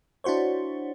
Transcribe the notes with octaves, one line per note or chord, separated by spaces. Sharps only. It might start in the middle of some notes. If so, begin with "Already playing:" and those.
D4 E4 F#4 C5 C#5